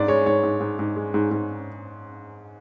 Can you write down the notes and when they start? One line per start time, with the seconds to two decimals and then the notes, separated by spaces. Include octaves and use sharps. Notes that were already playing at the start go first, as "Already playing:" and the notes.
Already playing: G#2 D4 D5
0.08 G#3 C#5
0.26 G#2 C#5
0.43 G#2
0.60 G#2
0.79 G#2
0.96 G#3
1.14 G#2
1.31 G#2